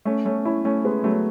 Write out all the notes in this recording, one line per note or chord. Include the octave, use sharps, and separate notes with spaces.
A3 C#4
A3 C#4
C#4 E4
A3 C#4
G#3 B3
F#3 A3